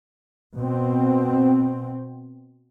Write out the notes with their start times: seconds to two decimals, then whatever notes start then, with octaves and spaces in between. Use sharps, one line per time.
0.55 B2 C4